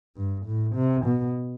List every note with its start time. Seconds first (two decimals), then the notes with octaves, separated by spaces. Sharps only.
0.17 G2
0.46 A2
0.76 C3
1.05 B2